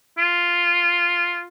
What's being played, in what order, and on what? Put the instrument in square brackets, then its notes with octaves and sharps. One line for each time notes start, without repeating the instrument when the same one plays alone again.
[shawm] F4